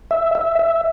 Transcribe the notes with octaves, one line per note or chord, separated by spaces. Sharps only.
E5
E5
E5